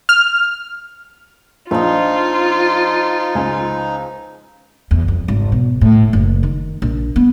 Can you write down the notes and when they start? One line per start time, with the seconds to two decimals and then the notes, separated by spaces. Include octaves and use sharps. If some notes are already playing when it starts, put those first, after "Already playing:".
0.09 F6
1.71 A#1 F3 D#4 F4 D#5
3.35 C#2 G#5
4.91 E2
5.08 F2
5.28 G#1
5.52 B2
5.81 A2
6.13 F#1
6.43 D#3
6.82 A#1
7.16 B3